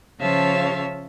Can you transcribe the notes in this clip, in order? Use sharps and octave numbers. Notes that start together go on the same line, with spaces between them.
C#3 F3 C#5 E5 F5 A5